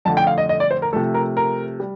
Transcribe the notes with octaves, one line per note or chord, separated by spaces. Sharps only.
F2 D3 A3 A5
G5
F5
D#5
D#5
D5
C5
A#4
C3 F3 A3 A4
A#4
A#4
G3